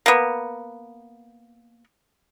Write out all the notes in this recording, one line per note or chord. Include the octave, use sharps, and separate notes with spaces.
A#3 B3